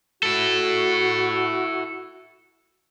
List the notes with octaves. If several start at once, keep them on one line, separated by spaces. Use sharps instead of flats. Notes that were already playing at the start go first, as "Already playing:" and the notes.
E4 F#4 A4